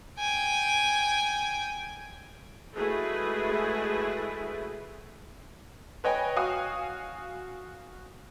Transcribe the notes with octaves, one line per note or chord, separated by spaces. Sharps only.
G5 G#5
G#3 A3 E4 F#4 G#4 B4
B4 C#5 D#5 G5 G#5
F#4 F5 G#5 D#6